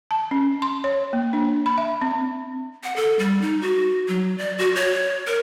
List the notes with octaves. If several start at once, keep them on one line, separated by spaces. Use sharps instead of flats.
A5
C#4
C6
C#5
A#3
D4
B5
E5
C4
F#5
A4
G3
D#4
F#4
F#3
D5
F#4
C#5
A#4